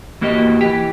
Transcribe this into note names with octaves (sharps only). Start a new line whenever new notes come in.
E2 A#3 F#4 G4 D#5
E3 G4